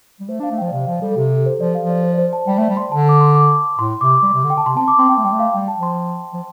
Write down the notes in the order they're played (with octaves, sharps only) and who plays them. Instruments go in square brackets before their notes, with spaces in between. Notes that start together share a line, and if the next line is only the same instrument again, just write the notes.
[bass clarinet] G3
[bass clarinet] A3 [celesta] C5
[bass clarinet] D4
[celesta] F5
[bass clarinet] A3
[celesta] G5
[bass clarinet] F3
[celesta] D5
[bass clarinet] C3 [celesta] F5
[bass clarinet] F3 [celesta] F5
[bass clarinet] G3 [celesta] A4
[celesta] A4
[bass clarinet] C3 [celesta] G4
[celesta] A4
C5
[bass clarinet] F3 [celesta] D5
[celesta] F5
[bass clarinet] F3
[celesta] D5
C5
D5
C5
A5
[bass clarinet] G3 [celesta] G5
[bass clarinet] A3
[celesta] D5
[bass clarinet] G3
[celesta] C6
[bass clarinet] D3 [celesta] A5
[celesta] D6
C6
D6
[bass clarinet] A2 [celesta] C6
[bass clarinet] C3 [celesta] D6
[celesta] D6
[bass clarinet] G3
C3
D3
[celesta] G5
A5
[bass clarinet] C3 [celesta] C6
[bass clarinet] C4 [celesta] A5
[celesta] D6
[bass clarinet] C4 [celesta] C6
[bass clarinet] C4 [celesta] G5
[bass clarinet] A3
[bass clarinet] G3 [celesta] G5
[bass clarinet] A3
[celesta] F5
[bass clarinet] G3 [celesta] G5
[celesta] A5
[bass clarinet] F3
[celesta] C6
[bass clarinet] F3